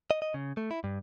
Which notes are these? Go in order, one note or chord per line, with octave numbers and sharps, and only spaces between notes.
D#5
D#5
C#3
A3
E4
G2